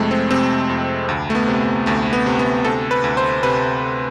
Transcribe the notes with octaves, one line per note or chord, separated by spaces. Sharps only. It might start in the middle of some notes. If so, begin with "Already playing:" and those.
Already playing: F2 C3 G#3 A3
C4
C3 C4
F2
D2
A3
B3
C3
D2 A3
B3
C3
B3
D2 A4
B4
D2
C5
C3 B4